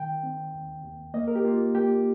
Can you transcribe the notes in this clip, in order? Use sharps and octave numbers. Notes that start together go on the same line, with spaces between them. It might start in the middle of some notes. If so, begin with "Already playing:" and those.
Already playing: D#3 G5
C4
D#2
D#2
A#3 D#5
A#4
G4
A#3 F4
A#3 G4